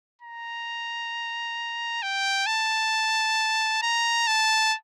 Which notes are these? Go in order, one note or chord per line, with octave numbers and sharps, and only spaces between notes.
A#5
G5
A5
A#5
A5